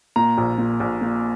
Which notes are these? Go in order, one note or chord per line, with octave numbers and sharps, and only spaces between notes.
A#2 A#5
A#1
A#2
A#1
A#2